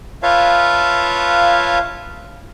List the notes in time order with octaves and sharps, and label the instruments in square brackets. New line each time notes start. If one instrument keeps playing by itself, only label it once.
[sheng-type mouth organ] F4 B4 C#5 E5 F5 A5